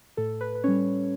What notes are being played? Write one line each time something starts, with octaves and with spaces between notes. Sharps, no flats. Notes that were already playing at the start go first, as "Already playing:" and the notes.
A2 A4
B4
B4
G3 C#4 C#5